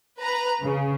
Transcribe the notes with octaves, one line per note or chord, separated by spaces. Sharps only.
B4 A#5
C#3